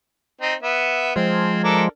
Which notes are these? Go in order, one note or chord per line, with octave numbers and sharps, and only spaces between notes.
C4 D#4
B3 E5
F3 G#3 C4
D4 A4 A#4